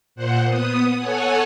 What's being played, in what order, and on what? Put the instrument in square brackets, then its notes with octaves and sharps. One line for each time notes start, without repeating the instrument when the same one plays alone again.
[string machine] A#2 C5 F#5
B3 D#6
A4 C#5 F#5 G#5